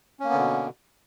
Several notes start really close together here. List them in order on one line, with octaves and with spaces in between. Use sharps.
C#4 A#3 B3 D3 B2